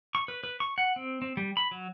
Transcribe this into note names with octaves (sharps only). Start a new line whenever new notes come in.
C#6
B4
B4
C#6
F#5
C4
C4
G3
B5
F#3